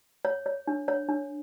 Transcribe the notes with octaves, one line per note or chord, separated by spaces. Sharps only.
C#5
C#5
D4
C#5
D4